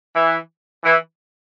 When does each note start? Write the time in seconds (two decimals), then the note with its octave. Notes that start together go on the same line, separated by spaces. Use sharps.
0.14 E3
0.84 E3